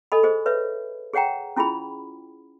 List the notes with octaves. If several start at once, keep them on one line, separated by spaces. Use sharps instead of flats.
A4 D#5 G#5 B5
G#4 C5 D#5
B4 C#5 E5
G#4 C#5 F#5 G5 A#5
C#4 E4 F4 G#4 B5